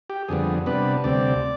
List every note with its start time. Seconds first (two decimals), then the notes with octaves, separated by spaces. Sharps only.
0.10 G4
0.28 F2 D3 G3 B3 G#4
0.66 C3 G3 B3 D4 B4
1.04 D2 C3 G3 C4 D5